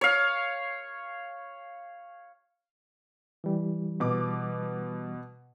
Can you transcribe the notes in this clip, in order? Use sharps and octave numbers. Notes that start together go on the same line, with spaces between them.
C#5 F5
E3 G3
B2 D6